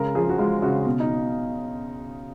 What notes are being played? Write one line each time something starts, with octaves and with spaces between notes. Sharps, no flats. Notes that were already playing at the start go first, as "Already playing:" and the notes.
Already playing: C#3 G#3 A#4
F3 G#4
F#4
G#3 F4
C#3 F#4
B2
D#4